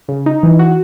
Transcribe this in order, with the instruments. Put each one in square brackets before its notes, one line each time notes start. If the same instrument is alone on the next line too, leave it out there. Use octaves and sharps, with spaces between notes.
[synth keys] C#3
D#4
E3
F#4